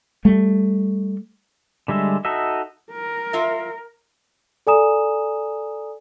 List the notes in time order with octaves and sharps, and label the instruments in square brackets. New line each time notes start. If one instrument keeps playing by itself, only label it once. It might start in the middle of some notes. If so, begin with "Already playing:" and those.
[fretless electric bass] G3 A3
[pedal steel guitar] D3 G3 G#3 E5
D#4 F#4 A4 D#5 E5
[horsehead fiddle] A#4
[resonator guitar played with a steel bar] F4 E5
[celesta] A4 D5 G#5 A#5 D#6 E7